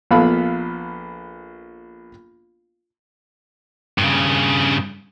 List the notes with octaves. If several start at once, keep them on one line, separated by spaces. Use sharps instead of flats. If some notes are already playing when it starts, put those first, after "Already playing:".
A#1 B3 A4 F5 B5
G2 C#3